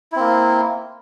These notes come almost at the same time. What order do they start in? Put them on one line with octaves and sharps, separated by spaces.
E4 C4 A#3